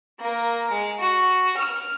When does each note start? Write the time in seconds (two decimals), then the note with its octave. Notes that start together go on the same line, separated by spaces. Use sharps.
0.19 A#3 A#4
0.70 G#3
0.99 F#4
1.57 F6